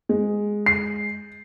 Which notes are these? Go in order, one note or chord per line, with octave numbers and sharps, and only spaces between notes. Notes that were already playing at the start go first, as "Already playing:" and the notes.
G#3
C7